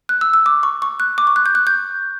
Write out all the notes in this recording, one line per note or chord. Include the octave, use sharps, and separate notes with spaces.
F#6
E6
E6
D6
C#6
C#6
F#6
D6
C#6
F#6
G6
F#6
G6